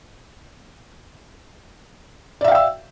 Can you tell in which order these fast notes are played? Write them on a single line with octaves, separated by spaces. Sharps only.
D5 E5 F5 G5 E6